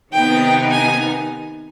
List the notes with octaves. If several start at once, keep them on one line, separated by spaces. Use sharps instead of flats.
C3 D#3 B3 D#4 G5
G#5